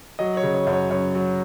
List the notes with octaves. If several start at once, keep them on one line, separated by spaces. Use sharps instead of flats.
F#3 D#5
C#5
C#3
C#5
F#2
C#5
F#2 C#5
F#3